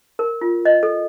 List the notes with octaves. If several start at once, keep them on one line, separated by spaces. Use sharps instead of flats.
A#4
F4
D#5
A4